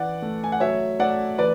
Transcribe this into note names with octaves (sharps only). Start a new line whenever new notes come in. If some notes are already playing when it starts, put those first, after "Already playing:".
Already playing: E3 D5 F#5
A3
G#5
F#5
F#3 C#5 E5
A3 D5 F#5
E3 B4 D5